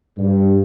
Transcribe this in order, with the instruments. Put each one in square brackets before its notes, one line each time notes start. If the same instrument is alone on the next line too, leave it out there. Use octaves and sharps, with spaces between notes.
[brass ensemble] G2